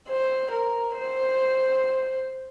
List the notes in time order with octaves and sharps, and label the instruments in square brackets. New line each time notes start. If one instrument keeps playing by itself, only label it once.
[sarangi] C5
A#4
C5